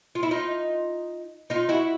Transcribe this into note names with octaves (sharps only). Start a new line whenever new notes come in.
F4
E4
D#4 F4
D#4 F4
E4 F#4